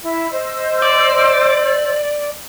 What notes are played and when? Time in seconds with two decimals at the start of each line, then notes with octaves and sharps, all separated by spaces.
0.01 E4
0.30 C5 D#5 E6
0.82 D5